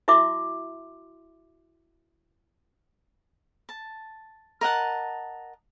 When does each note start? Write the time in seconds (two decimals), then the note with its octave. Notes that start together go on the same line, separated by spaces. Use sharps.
0.08 E4 F#4 E5 C6 D6
3.69 A5
4.61 A#4 D#5 F#5 A5